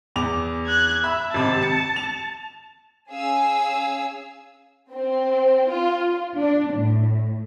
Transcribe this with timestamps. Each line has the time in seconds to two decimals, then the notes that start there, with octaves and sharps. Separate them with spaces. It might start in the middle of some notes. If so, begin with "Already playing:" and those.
0.16 E2 D6 F7
0.67 F#6 G#6
1.04 E5 B5
1.34 G#1 C3 A5
1.63 C#7
1.96 F7
3.10 C#4 G#4 F5 G#5 E6
4.92 C4
5.69 F4
6.39 D4
6.72 A2